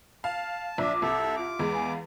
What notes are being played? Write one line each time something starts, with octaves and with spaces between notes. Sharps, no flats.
F5 A5
A#1 D4 E5 D6
C2 A4 E5
F4 E5 D6
E2 G#3
F5 G#5 B5